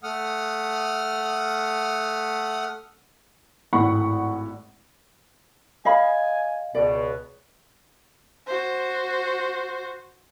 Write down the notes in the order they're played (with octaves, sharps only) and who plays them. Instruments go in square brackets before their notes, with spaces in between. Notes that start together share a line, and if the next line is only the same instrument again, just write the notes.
[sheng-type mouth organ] A3 F#5 D#6 F6
[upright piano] G#1 A2 F#5 B5 C#6
[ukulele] D#5 F5 B5 [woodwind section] G#5
[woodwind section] C#2 B2 [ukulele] D5
[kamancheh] F#4 C5